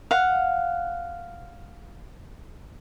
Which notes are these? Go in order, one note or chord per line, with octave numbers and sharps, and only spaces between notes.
F5 F#5